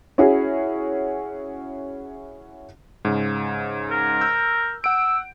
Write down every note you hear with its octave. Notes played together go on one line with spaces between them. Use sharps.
C#4 E4 F#4 G#4
G#2 C#3
A#4
E6 G6
F#5 E6 D7